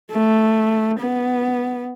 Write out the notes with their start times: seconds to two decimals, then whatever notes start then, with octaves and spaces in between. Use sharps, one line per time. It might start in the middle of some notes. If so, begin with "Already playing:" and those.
0.11 A3
1.00 B3